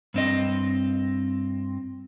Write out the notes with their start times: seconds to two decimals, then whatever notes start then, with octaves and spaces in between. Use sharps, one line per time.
0.14 G2 C4 D#5